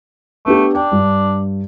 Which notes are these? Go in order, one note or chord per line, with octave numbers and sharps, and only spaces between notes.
A3 B3 D4 G4
D4 G5
G2